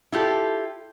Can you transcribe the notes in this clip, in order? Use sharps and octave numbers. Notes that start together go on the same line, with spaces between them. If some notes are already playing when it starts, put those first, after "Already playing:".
E4 F4 G4 A4